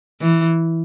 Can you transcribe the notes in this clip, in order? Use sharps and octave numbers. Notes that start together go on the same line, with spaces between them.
E3